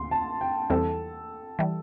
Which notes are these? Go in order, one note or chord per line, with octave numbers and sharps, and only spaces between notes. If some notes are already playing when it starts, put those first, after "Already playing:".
Already playing: D2 C6
A5
G5
E2 E3 G3 C4 A4
E3 G3